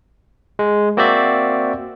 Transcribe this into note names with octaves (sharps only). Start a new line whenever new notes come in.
G#3
A#3 C4 F#4 C5 D5 E5